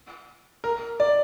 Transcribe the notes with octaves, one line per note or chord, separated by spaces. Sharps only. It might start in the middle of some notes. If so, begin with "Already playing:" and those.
A#4
D5